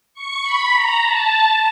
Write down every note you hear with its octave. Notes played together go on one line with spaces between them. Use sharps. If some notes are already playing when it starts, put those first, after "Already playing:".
C#6
B5
A#5
A5